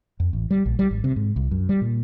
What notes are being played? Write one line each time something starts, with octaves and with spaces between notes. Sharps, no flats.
F2
A1
G3
A#1
G3
G#1
C3
G#2
C2
F#2
G3
A#2